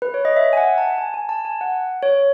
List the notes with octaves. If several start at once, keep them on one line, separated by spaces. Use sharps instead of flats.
B4
C#5
D#5
E5
G#5
F#5
A5
G#5
G#5
A5
G#5
F#5
C#5